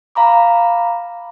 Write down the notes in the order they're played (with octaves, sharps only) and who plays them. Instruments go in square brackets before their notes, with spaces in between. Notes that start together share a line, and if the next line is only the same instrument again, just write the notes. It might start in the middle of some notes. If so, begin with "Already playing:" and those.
[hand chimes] F5 A#5 B5 D6